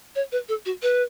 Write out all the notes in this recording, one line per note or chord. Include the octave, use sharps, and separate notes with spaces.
C#5
B4
A4
F#4
B4